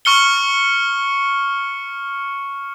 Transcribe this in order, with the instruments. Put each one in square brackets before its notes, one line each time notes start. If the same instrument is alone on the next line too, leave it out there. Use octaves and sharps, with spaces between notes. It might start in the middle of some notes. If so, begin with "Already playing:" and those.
[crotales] C#6 F6 C#7 G7